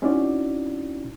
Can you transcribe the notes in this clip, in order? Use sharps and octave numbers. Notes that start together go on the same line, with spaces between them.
C4 C#4 D#4 E4 F#4 D5